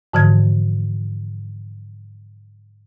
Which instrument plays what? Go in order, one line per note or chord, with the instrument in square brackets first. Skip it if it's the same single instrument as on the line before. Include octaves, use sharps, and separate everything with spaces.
[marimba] G#2 D3 E3 F3 G#6